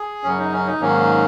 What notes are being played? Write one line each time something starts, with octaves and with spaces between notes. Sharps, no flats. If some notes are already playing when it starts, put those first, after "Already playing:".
Already playing: G#4
F#2 C#3 F#3 C#4
D#4
C#4
D#4
G#2 D#3 F#3 A#3 C#4